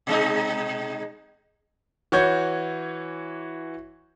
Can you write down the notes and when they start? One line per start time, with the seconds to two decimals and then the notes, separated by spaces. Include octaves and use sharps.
0.07 B2 G#3 D#4
2.12 E3 F#4 C#5 G6 G#6 C#7